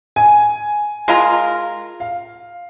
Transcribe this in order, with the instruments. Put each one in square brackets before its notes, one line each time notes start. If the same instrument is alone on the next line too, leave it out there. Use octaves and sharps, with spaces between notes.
[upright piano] G#5
[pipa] G#3 F4 A#4
[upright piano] F5